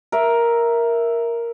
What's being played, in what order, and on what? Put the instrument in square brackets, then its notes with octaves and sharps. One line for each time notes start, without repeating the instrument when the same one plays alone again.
[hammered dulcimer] A#4 E5